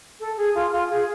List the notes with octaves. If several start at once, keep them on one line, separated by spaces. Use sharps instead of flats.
A4
G#4
F4
F4
G#4